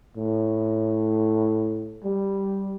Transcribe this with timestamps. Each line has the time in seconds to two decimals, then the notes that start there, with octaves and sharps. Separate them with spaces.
0.17 A2
2.04 G3